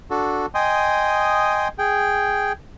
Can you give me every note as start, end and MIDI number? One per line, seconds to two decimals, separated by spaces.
0.10 0.46 62
0.10 0.46 66
0.10 0.46 69
0.55 1.68 75
0.55 1.68 79
0.55 1.68 80
0.55 1.68 84
0.55 1.68 87
1.79 2.52 68
1.79 2.52 79